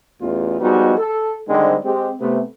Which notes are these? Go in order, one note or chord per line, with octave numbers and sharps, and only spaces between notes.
A1 E2 F4
F3 G3 G#3 B3 D#4 F#4
A4
D3 D#3 G3 G#3 C4
G#3 C4 G4
C3 A3 B3